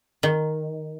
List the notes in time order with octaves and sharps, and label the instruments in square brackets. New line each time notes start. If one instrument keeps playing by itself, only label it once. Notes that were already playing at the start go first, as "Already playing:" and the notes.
[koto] D#3